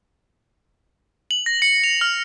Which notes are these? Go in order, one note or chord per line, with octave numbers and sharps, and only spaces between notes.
F#7
A#6
C#7
F7
F6